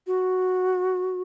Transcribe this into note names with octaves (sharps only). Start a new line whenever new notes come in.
F#4